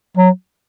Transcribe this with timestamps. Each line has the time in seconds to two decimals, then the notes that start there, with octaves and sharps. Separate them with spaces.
0.17 F#3